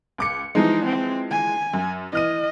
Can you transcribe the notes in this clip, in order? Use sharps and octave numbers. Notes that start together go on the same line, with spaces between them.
C#2 D6 C#7
E3 F3 G#3 D#4
C4
G#5
F#2
E3 D#5 F6 D#7